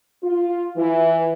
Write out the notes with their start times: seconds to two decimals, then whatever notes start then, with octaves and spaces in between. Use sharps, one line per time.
0.23 F4
0.76 E3